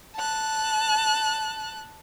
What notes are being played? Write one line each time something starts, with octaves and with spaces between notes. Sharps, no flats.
A5 F#6